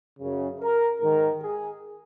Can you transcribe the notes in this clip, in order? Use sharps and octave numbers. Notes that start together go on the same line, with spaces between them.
F#2 C#3
A#4
G#2 D#3 A#4
G#4